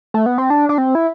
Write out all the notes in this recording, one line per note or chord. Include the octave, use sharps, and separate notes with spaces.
A3
B3
C4
D4
D4
C4
E4